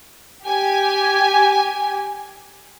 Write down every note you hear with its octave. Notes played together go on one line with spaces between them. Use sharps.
G4 G#5